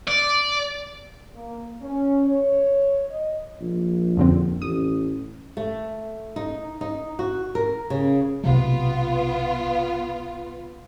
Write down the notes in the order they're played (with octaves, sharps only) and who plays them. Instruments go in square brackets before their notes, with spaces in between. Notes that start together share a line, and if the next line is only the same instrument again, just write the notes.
[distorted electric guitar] D5
[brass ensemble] A#3
C#4
C#5
D#5
[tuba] A#1
[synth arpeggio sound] F2 D3 C4
[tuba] A1 [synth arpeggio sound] D#6
[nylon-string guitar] A3
D#4
D#4
F#4
A#4
C#3
[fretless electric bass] B1 C3 A3 [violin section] B3 F4